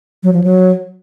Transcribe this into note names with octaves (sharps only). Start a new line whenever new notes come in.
F#3
F3
F#3